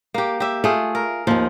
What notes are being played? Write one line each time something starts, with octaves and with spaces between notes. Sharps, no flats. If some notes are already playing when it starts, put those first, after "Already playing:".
A#3 G4
G4 E5
A3 F4 G#4
A#4
D#2 D#3 F3